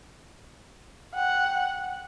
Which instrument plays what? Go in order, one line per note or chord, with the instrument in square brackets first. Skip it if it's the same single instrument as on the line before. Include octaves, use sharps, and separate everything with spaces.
[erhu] F#5 [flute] G5